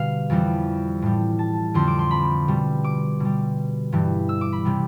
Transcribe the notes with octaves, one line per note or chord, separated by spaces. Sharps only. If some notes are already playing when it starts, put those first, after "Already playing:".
Already playing: B2 D3 G3 F5
F2 E3 G3
A2 G3
A5
F2 D3 F3 C6
D6
C6
B5
B2 G3
D6
B2 G3
G2 E3 G3
E6
D6
B5
C3 G3